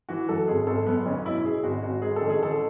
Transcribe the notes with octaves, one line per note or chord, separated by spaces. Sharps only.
E3 F#4
F#2 A4
G#1 G#4
G#1 A4
F#2 B3
B1 C#4
B2 E4
B2 G#4
G#1 F#4
G#1 F#4
G#2 G#4
A4
A1
G#4
A1 A4